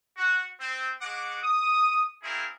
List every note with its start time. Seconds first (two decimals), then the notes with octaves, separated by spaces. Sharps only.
0.17 F#4
0.59 C4
1.01 G#3 F#4 F#5 D6
1.42 D#6
2.22 A#3 C4 C#4 E4 G#4 A#4